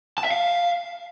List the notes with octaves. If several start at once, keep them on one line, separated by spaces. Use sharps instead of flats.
A5
E5
F5